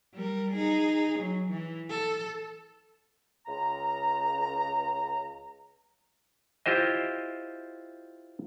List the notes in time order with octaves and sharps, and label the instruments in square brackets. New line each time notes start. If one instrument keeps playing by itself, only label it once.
[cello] G3 A#4
D#4 G#4
F#3
E3
A4
[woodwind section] C#2 A#5
[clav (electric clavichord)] E4 F4 G4 C5 D#5